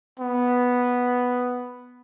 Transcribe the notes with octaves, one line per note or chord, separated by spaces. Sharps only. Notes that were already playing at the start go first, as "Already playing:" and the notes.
B3